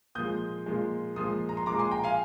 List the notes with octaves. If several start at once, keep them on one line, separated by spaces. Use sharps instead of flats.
A#2 F3 G#3 D#6 G6
A#2 F3 G#3
A#2 F3 G#3 C6 D#6
A#5
C6
A#2 F3 G#3 A#5 D6
G#5 C6
G5 A#5
F5 G#5